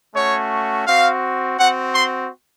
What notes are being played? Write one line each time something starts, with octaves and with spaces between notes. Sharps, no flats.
A3 C#4 F#4 C#5
C4 F#4 F5
C4 F#4 F#5
C6